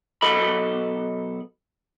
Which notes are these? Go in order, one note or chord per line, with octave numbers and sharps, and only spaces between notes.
B1 F#3 A4 D#5 B5